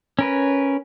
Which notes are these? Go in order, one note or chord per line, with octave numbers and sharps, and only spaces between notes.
C#4 A#4 B4